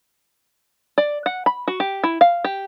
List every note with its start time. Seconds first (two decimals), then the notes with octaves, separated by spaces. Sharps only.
0.98 D5
1.26 F#5
1.46 B5
1.68 F#4
1.80 G4
2.04 E4
2.21 F5
2.45 G4